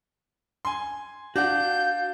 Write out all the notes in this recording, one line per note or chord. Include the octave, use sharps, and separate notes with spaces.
G#5 C6
D4 F#4 F5 F#5 G6